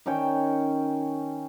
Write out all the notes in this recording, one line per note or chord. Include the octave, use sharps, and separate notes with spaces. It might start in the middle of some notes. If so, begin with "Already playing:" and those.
D#3 C#4 C#5 G5